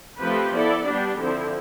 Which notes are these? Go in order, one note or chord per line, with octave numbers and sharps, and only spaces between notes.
F3 A3 C4 G4 B4
B3 E4 A4 D5
G3 B3 D4 G4
D3 F3 C4 E4